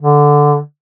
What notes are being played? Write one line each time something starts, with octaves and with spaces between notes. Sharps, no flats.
D3